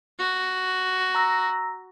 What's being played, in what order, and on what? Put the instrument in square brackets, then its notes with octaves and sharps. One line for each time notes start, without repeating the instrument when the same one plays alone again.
[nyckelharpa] F#4
[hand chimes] A#5 E6 A#6